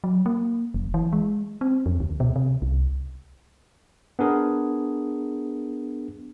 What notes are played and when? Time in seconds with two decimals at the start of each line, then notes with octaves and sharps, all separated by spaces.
0.04 F#3
0.26 A#3
0.74 F1
0.94 E3
1.13 G#3
1.61 C4
1.86 F2
2.00 D2
2.20 B2
2.36 C3
2.62 C2
4.19 B3 D4 G#4 A#4